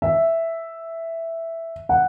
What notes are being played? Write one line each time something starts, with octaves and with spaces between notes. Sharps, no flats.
E5
F#5